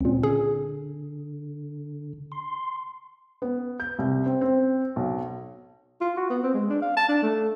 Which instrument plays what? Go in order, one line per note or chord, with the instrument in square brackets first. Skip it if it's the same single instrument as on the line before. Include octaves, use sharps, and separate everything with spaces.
[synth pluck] C#2 A#2 [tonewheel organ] C4 C#4
[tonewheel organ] D3 [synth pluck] G#4
[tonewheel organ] C6
[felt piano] B3
G6
C2
C4
C4
B1
[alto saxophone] F4
F#4
B3
C4
G#3
D4
F5
A5
D4
A3